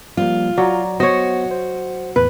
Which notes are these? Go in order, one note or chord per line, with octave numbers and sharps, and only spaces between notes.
F3 G3 A#3 F4
F#3 D5 A#5
B3 F#4 C5 C#5 D#5
C5
E2 A2 B4